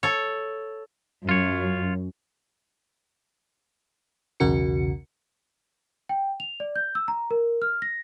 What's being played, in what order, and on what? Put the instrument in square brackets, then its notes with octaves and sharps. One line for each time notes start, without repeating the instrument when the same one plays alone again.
[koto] A4 C#5
[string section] F#2 [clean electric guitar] F4 C#5
[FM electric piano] B1 E2 C#3 F#4 A#4 C#7
[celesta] G5
F7
D5
G6
E6
A#5
A#4
F6
A#6